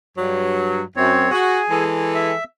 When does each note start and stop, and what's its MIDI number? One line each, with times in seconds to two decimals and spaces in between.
0.18 0.82 43
0.18 0.82 54
0.96 1.26 42
0.96 1.31 60
0.96 1.31 73
1.31 1.59 66
1.31 1.84 68
1.31 1.84 80
1.70 2.32 52
1.70 2.32 56
1.70 2.32 69
2.15 2.44 76